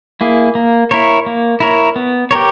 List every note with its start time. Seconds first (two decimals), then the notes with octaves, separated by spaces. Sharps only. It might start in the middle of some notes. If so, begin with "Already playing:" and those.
0.21 A#3 E4 G#4
0.55 A#3
0.91 E4 A#4 C#5
1.26 A#3
1.60 E4 A#4 C#5
1.96 B3
2.31 G4 A#4 C#5